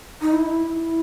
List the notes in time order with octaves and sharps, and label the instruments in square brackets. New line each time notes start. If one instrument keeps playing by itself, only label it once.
[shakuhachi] D#4
E4
E4